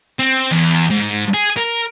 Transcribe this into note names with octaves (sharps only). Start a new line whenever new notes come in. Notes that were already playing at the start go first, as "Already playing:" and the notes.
C4
E2
G#2
G#4
A#4